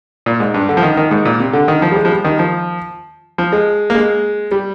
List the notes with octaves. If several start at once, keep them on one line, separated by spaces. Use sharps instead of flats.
A#2
G#2
G2
D3
F3
D#3
D#3
G#2
A#2
C3
D3
D#3
F3
G3
G#3
F3
G3
D#3
F3
F3
G#3
A#3
G#3
G3